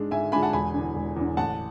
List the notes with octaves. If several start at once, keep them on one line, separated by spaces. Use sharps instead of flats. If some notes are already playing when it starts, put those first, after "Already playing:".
Already playing: G#2 G#3 D4
G#2 E5 G#5
G#3 D4 G#5 B5
F#5 A5
E1 G#5 B5
E2 D3
E1
E2 D3
A1 F#5 A5